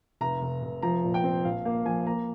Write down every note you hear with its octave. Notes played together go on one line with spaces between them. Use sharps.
F1 A#5
F1
F1
F3 A#5
A#2
G5
C4
A#1 F5
A#3 F5
F3 G#5
A#3 A#5